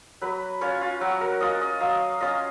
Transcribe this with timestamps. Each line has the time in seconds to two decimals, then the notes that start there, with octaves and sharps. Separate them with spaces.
0.22 F#3 B4
0.61 C#4 F4 C#5
0.81 F4
1.01 F#3 F#4
1.21 A#4
1.41 C#4 F4 D#5
1.61 D#5
1.81 F#3 F5
2.21 C#4 F4 D#5